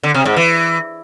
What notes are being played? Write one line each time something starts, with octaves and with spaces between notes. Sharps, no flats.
D3
C3
G#2
E3